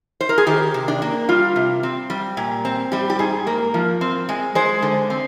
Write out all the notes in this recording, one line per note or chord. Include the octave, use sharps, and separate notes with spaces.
C5
A#4
G#4
D#3 G4
C3
D4
A#3
G3 F4
C3
C4
G3
A#2
C4
G3 G4
G4
G#2 G#4
A#3 A#4
F3
C4
G#3
G#3 C5
D3
C4